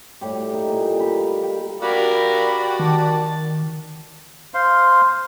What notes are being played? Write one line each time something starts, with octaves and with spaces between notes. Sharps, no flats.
A2 G3 G4
D#4
A#2
D#4 B5
F5 B5
G5
F#4 G4 A#4 D5 F5 B5
D#3 A5
C5 F5 C6